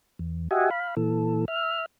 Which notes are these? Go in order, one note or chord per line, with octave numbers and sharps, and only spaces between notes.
E2
F#4 G4 D#5 E5 F#5 G#5
F5 B5
A#2 E3 A4
E5 F6